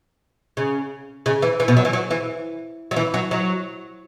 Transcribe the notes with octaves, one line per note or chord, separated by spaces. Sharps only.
C#3
C#3
E3
E3
B2
F#3
E3
F#3
E3
F#3
E3
F#3
F#3